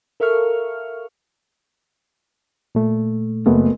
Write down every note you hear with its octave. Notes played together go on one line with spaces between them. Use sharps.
A4 A#4 E5 F5 C#6 F6
A#2 A3
F#1 A3 B3